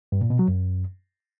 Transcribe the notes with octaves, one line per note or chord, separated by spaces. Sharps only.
G2
A#2
B2
F#3
F#2